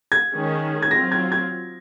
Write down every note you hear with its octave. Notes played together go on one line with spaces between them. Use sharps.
G#6
D#3 G#3 C#4 G#4
G#6
F#3 C4 F4 A#6
G#6
G#6